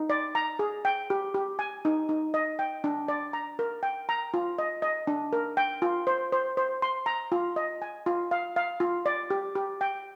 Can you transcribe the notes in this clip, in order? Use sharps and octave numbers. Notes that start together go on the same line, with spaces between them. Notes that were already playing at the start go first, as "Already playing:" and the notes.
Already playing: D#4
D5
A#5
G#4
G5
G4
G4
G#5
D#4
D#4
D#5
G5
D4
D5
A#5
A#4
G5
A#5
F4
D#5
D#5
D4
A#4
G5
F4
C5
C5
C5
C6
A#5
F4
D#5
G#5
F4
F5
F5
F4
D5
G4
G4
G5